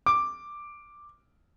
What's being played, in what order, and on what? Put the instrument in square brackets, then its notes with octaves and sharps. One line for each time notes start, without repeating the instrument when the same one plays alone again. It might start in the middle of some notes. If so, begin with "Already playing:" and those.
[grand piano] D6